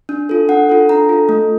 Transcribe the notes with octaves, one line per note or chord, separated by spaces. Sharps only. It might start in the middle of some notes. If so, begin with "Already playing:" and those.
D4
F4 A4
D4 F#5
F4 A4
D4 A#5
F4 A4
A3